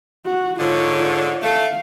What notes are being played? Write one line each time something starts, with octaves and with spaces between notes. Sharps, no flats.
F#4
G#2 D3 F4 C#5
A3 F5